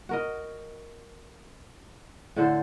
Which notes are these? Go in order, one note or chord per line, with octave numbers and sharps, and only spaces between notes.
F#4 A#4 D#5
A2 D3 A4 C5